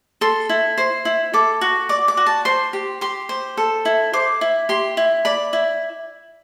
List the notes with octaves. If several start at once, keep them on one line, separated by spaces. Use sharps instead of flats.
A4 C6
E4
C5
E4
A4 D6
F#4
D5 D6
D6
F#4
A5
C5 C6
G4
G4 C6
C5
A4
E4
C5 D6
E4
G4 C6
E4
D5 B5
E4